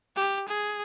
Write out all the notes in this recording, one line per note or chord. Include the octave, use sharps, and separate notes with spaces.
G4
G#4